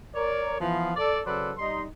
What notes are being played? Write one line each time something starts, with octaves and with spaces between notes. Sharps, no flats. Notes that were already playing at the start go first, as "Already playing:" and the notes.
A#4 C#5 D5
E3 F3 B3
A4 D5
C#3 F#3 A4 B4 C5 D5
G3 D#4 C6